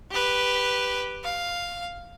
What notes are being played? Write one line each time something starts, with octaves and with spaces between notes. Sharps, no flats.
G4 B4
F5